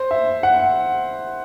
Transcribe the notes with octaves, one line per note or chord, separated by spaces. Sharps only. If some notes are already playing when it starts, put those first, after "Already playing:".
Already playing: C5
E5
F#5